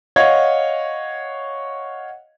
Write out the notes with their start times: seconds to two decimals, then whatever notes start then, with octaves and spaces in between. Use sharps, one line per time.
0.16 C#5 D#5 F5 F#5 G#6